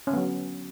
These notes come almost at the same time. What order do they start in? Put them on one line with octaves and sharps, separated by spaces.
C#4 D3 B3 F#3